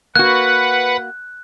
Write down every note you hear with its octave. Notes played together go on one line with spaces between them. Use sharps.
A#3 F#4 B4 F#5 F#6